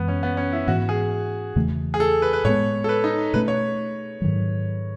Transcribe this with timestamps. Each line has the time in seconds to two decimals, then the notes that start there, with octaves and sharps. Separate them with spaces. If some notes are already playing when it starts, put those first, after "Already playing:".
Already playing: F#2 E3 G#3 B3
0.08 C#4
0.23 B3
0.37 C#4
0.53 E4
0.67 G#2 E3 B3 F#4
0.89 G#4
1.56 E2 C#3 E3 A3
1.94 G#4
2.00 A4
2.22 B4
2.33 B4
2.45 A2 G#3 B3 C#5
2.84 A4
2.89 B4
3.04 D#4
3.34 B2 A3 C#4 B4
3.48 C#5
4.22 G#2 D#3 F#3